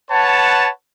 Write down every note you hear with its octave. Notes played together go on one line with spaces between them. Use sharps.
B4 C#5 F#5 A5